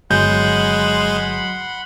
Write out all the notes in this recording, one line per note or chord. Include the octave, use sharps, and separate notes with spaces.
G1 F#3 G#3 F#5 B5 C6 G6